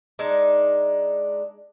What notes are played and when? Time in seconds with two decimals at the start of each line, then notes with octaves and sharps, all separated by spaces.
0.19 G#3 D4 D#4